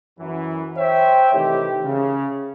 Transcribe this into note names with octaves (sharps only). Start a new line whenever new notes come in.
F#2 E3
C5 C#5 E5 G5
C3 D#3 E3 A3 G4
C#3